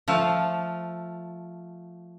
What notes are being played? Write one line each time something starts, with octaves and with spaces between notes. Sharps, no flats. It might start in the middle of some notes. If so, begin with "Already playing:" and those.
F3 A3 F5